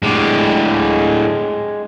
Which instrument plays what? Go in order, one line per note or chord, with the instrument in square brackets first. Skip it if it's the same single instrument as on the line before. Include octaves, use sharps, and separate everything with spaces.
[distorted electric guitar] A2 D3 [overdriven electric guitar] G#3 G4